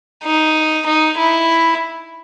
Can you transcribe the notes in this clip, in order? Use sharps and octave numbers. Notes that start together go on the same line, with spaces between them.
D#4
D#4
E4